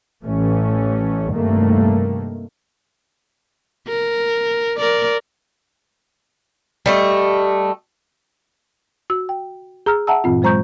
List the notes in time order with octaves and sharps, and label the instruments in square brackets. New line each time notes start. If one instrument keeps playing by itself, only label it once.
[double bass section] A1 E3 A3 C#4
G2 C3 D#3 A3 A#3
[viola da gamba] A#4
A#4 D5
[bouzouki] G3 A3 D#5
[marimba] F#4 E6
G5
G#4 A#5 E6 F6
E5 F#5 A5 A#5 E6
G2 A#2 E3 C4 F4
F#3 G#3 C5 A#5 C#6 G6